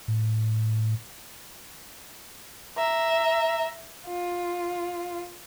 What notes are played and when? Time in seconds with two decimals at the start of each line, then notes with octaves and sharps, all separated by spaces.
0.08 A2
2.78 E5 A#5
4.07 F4